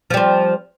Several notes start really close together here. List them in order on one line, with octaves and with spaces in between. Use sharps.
F3 G3 C4